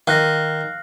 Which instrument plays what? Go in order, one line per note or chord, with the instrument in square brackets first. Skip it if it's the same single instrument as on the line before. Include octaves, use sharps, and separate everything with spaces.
[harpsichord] D#3 [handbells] F5 F#6 A#6